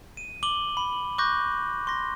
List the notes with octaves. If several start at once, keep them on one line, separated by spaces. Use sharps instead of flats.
D#7
D6 F#7 G7
B5
C#6 D6 F#6 G6 A#6
C6 A#6